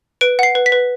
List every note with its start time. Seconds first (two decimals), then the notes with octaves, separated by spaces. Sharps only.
0.21 B4 D7
0.39 F#5 C7
0.55 B4
0.66 B6
0.72 B4